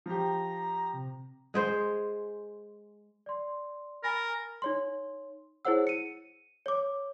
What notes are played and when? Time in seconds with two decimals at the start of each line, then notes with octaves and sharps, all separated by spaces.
0.06 F3 G4 A#5
0.94 C3
1.54 G#3 G#4 C5
3.26 D5 C6
4.04 A#4 G#5 B5 A6
4.62 D#4 C#5 C6
5.65 E4 G#4 C5 C#5 F#5 E6
5.87 C#7 D#7
6.66 C#5 D6